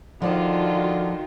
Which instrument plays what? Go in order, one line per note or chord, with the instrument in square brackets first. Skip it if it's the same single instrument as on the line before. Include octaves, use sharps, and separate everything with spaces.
[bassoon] D3 [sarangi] D#3 [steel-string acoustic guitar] F3 D5 A5 [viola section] F4 F#4